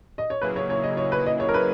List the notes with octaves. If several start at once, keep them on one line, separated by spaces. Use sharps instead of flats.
D#5
C#5
C#3 F#3 A#3 E4 G#4 B4
C#5
C#5
D#5
C#5
B4
D#5
C#5
A#4
B4